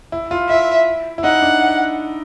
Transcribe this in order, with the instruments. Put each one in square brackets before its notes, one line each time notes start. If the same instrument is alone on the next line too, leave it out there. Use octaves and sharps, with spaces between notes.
[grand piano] E4
F4
[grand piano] E4 [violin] E5
[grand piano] E4
[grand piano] D#4 [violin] F#5
[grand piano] D4